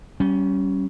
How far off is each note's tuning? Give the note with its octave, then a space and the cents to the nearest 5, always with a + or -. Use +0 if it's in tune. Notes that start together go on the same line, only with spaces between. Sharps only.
G3 -30 C#4 +0